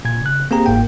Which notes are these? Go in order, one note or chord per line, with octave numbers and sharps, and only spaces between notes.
A#2 G#6
C#3 F#6
A#3 C4 G4 G#4 A#5
G1 G#2 A#3 G5